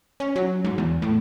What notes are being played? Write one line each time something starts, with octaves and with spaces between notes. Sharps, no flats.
C#4
F#3
G#2
E2
A2